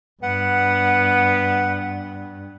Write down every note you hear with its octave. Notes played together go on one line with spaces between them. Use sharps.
G2 B3 F#5